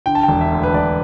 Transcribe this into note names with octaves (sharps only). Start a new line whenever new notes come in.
D3 G5
A5
E1 G5
E5
D2
B4
E1 D5